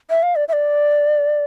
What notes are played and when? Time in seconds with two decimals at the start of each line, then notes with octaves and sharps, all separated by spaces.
0.10 E5
0.23 F5
0.36 D5
0.48 E5
0.53 D5